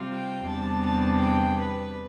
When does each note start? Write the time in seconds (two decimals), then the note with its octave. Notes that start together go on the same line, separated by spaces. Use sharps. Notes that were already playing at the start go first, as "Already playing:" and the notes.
Already playing: C3 G3 C4 F4
0.13 G5
0.48 E2 C3 G3 B3 D4 A5
0.85 A5
1.21 G5
1.58 B4